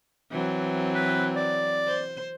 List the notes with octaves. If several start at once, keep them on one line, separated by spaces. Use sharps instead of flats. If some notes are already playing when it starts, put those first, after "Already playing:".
E3 F#3 C4
B4
D5
C5